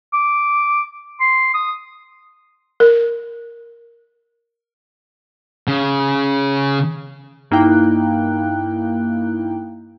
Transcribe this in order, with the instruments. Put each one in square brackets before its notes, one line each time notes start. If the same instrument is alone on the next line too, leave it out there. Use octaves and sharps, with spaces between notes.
[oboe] D6
C6
D#6
[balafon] A#4
[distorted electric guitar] C#3
[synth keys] G2 A#3 D#4 E4 G5 F#6